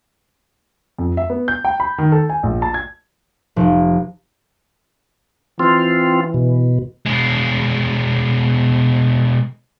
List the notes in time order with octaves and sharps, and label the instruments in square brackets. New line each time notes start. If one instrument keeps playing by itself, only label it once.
[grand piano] F2
E5
B3
G6
G5
B5
D#3
A4
G#5
A#1
A5
G#6
[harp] F1
[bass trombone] E3 [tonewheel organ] C4 F4
[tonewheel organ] B2
[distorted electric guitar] B2 G#3